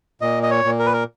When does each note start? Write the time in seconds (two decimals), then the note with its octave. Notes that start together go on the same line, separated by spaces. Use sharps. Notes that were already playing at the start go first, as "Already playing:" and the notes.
0.22 A#2 D#5
0.43 D#5
0.50 C#5
0.64 A#2
0.79 A#4
0.86 B4
0.93 A#4